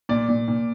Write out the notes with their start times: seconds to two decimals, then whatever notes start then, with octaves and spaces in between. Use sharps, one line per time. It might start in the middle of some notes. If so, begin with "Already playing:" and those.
0.09 A#2 D5
0.29 A#2
0.48 A#2